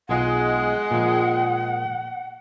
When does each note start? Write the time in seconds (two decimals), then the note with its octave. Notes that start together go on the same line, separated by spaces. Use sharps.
0.09 B1 G#3 F4 F#5
0.91 A#2 F3